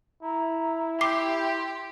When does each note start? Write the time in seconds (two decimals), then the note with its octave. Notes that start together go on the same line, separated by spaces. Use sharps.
0.23 E4 A#5
1.01 G4 C6 D6 C7